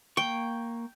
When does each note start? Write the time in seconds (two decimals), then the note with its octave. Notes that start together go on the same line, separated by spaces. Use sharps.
0.17 A#3 G5 C#6